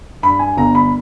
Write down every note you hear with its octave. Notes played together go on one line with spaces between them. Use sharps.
G2 B5
G#5
G1 A#5
B5